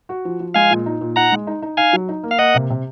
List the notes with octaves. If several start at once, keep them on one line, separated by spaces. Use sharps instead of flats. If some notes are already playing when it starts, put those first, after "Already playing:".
F#4
F3
F3
G#3 F5 G#5
A#2
D#4
A#2
D#4 F#5 A#5
G#3
D#4
D#4
D#4 F5 G#5
F#3
D#4
A#3
F5
A#3 D#5 F#5
C3
C3